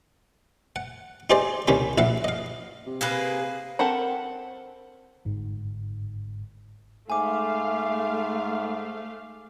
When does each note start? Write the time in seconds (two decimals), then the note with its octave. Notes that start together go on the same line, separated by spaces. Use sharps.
0.76 F#5
1.30 D#4 G4 G#4 C5 D5 D#5
1.68 C2 D#3 C#4 G4 B5
1.98 A#1 E4 F5 F#5
2.24 D#5 F5
2.86 C3
3.01 A#3 G#4 B4
3.79 C4 A4 A#4 F#5 B5
5.25 G1 G#2
7.10 G#2 A3 E5 F5 G#5 D6